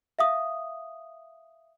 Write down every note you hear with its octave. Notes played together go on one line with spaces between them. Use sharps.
E5 F5 D#6